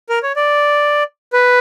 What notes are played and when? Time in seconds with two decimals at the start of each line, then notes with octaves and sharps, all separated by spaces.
0.09 A#4
0.23 C#5
0.36 D5
1.33 B4